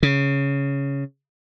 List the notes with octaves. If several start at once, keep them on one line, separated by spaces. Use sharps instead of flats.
C#3